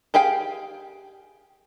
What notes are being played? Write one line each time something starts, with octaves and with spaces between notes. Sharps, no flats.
G4 G#4 F5 G5